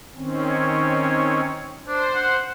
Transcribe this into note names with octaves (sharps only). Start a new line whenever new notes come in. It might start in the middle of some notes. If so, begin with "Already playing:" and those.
D#3 C4 C#4
C#5
D4 C5
F#5